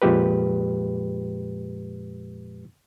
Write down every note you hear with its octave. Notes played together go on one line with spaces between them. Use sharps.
F2 A#2 F3 G#3 G4 B4